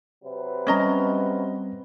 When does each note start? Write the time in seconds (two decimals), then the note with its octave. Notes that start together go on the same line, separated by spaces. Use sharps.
0.24 C3 F#3 B4
0.67 G3 C4 C#4 D#5 A#5